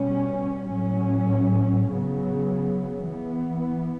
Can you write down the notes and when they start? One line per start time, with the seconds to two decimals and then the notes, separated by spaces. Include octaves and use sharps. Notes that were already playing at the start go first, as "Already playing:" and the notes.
Already playing: B2 G3 C#4
0.71 A2 F#3 C#4
1.90 C#3 F#3 B3
3.08 E3 B3